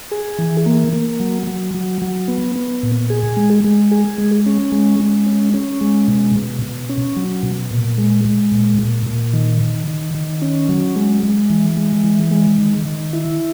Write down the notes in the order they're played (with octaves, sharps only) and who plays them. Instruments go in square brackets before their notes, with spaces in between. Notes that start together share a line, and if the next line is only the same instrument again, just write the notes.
[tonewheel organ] G#4
E3
A#3
A#3
F#3
F#3
F#3
F#3
B3
B3
A#2
G#4
G#3
G#3
G#4
G#3
C#4
G#3
G#3
C#4
C#4
G#3
B2
B2
B2
C#4
F#3
B2
A#2
G#3
G#3
A#2
A#2
A#2
D#3
D#3
D#3
D#3
C#4
F#3
G#3
G#3
E3
G#3
E3
G#3
D#3
D#3
E4